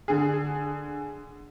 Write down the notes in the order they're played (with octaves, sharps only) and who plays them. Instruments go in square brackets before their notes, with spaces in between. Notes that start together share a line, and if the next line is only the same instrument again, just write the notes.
[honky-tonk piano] D3 G#4